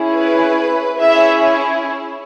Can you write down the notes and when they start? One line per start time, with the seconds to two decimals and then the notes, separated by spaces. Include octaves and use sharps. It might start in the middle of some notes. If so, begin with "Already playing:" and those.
Already playing: C#4 E4 G#4
0.13 B4
0.99 C#4 E4 G#4 E5